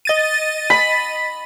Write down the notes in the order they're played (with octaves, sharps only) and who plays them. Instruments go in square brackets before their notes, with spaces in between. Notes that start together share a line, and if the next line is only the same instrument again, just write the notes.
[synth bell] D#5 A6 D#7
[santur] B5